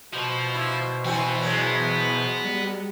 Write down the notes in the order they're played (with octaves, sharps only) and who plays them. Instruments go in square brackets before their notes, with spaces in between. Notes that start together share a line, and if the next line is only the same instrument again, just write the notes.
[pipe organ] B2 C5 [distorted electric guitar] F3
[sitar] E4
[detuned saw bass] E3 [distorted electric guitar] B3 G#5 [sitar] C4 F#4
[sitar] F#3 G#3
[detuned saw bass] G3